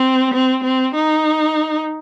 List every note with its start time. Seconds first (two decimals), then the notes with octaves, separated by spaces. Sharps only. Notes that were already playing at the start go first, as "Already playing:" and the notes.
Already playing: C4
0.34 C4
0.64 C4
0.95 D#4